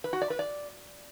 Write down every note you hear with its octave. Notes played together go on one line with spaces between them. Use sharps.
B4
F#4
D5
B4
D5